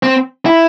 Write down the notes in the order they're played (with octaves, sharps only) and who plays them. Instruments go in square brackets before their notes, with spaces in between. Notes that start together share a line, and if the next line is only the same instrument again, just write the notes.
[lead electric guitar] C4
E4